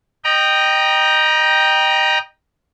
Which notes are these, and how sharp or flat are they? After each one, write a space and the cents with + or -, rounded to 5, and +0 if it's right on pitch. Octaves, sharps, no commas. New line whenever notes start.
D#5 -20 G5 +0 A#5 +25